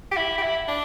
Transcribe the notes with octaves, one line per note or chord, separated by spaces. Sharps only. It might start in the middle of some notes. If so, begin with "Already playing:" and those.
G4
E4
G4
E4
D4